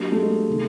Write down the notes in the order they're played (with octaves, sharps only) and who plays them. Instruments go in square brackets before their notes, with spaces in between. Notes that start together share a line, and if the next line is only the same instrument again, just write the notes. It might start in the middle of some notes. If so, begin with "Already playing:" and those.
Already playing: [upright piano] F#3 A#3 D4 G4
[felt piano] A3
G#3
[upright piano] C3 D#3